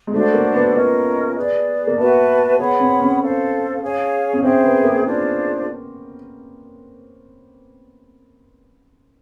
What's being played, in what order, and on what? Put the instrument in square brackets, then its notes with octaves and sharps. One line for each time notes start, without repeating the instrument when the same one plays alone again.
[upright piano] G#3
[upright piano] A3 [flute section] D4 F#4 A4 C5
[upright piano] A#3
B3
[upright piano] B3 [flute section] C#4 F4 A#4 D#5
[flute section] G#4 B4 D5
[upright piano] A#3
[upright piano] B3 [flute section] F#4 B4 E5 A5
[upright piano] B3 [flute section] G#4 C#5 F#5 B5
[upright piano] C4
C#4
[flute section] A4 C5 F5
G#4 C#5 F5 G#5
[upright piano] C#4
[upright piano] C4 [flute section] G#4 C5 E5 G5
[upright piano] B3
A#3
[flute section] D4 F4 G#4 C5